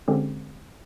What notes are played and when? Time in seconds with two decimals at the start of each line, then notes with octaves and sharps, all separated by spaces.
0.08 D3 G#3 C4 C#4 G4